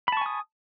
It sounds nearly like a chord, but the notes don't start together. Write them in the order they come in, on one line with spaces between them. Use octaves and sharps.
B5 A5 C#6 G#5 D#6